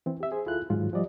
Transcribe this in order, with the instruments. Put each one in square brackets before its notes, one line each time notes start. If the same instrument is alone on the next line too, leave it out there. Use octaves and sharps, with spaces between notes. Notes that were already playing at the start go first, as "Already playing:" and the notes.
[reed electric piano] E3 C4
G4 E5
G#4 C5
D2 E4 F4 A4 F#6
G#2 D#3 F#3 F4
F3 G3 D5 D#5